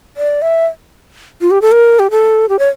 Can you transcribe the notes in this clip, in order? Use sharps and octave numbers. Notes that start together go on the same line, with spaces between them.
D5
E5
F4
G4
A4
A#4
G4
A4
G4
C#5